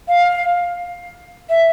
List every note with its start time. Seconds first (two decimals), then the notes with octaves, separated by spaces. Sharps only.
0.08 F5
1.50 E5